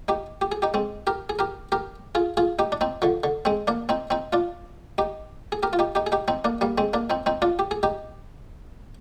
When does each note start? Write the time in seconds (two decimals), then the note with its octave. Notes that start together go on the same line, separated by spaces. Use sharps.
0.08 D#4 G4
0.41 G4
0.52 G#4
0.62 D#4 G4
0.74 G#3 C4
1.07 G4 A#4
1.29 G#4
1.39 G4 A#4
1.72 G4 A#4
2.15 F4 G#4
2.37 F4 G#4
2.59 D#4 G4
2.72 D4
2.81 C4 D#4
3.02 D3 F3
3.24 D3
3.45 G#3 C4
3.67 A#3 D4
3.89 C4 D#4
4.10 C4 D#4
4.33 D4 F4
4.98 D#4 G4
5.52 G#4
5.63 G4 A#4
5.73 F4
5.79 D#4 G4
5.95 D#4 G4
6.07 G#4
6.12 D#4 G4
6.28 C4 D#4
6.45 A#3 D4
6.61 G3 A#3
6.78 G#3 C4
6.93 A#3 D4
7.10 C4 D#4
7.26 C4 D#4
7.42 D4 F4
7.59 G4
7.71 G#4
7.83 D#4 G4